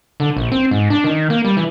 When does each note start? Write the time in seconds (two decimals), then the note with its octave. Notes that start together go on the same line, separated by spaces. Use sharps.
0.20 D3
0.37 A#1
0.52 C4
0.71 G#2
0.90 D4
1.04 D#3
1.30 A#3
1.45 G3
1.57 E3